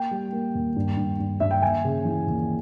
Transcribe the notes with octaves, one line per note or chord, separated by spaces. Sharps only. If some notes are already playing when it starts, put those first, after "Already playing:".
Already playing: A#3 G5
G3
A#3
D#2
G2
G2
G2
G2 E5
G5
D#2 G#5
C#3
E3
D#2